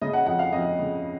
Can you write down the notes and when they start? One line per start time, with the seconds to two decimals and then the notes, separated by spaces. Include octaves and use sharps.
0.02 C#3 D#5
0.13 F#5
0.26 F2 F#5
0.39 F5
0.53 F2 D#5
0.79 C#3